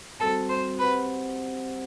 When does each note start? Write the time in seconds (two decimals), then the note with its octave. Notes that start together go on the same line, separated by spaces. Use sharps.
0.19 G3 C4 F#4 A4 C5
0.50 C5
0.79 C4 G4 B4 C5 F#5